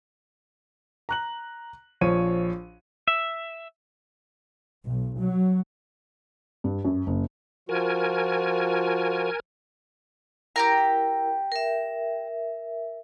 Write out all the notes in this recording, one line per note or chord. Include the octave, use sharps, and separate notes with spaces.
A#5 F#6 F#7
A#1 F3 C#5 D#7
E5
B1
F#3
G2
F#2
F#1
F3 F4 F#4 A#4 G#5
E4 G4 A#4 G5 A#5
A#4 E5